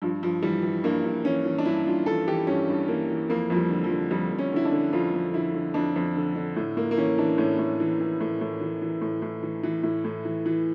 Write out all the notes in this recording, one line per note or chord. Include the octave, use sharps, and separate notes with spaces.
G2 F3
G2 F3
E3 G3
E3
G2 A#3
G2
E3 C#4
E3
D4
G2 E4
G2 F4
E3 A4
E3 G4
G2 C#4
G2
E3 A#3
E3
F2 A#3
F2 F3
G3
D3
F3
D3
F2 G3
F2
C#4
D3 E4
D4
D3
F2 F4
F2
D3 E4
D3
F2 D4
F2
D3
D3
A2
A2 A#3
A#3
E3 C#4
E3 D4
A2 C#4
A2
E3
E3
A2
A2
E3
E3
A2
A2
E3
E3
A2 E4
A2
E3
E3